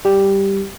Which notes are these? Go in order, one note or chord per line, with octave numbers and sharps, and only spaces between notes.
G3 G4